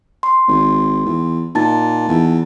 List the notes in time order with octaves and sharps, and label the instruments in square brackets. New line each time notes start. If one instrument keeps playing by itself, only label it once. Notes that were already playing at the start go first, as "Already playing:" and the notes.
[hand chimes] C6
[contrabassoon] G#1
E2
[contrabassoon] A#2 [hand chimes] D#4 A5 A6
[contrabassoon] E2